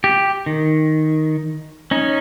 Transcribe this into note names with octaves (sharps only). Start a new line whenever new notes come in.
G4
D#3
C#4 D#4